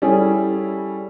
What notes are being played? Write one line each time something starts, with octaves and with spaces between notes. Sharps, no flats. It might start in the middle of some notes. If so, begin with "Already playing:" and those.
G3 C#4 E4 G#4 A4